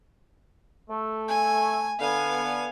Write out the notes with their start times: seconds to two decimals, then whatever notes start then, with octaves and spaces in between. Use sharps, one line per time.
0.90 A3
1.28 G#5
2.00 D3 B3 F5 G#5